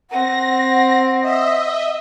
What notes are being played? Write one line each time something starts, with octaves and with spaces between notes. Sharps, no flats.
C4 F#5 A#6
D#5 E5